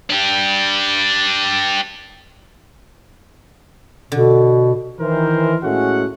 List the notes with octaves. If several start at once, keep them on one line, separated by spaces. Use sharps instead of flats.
D4 G4
B2 D3
D#3 E3 A#4 C5
A2 G#3 A3 C#4 F#4 F#5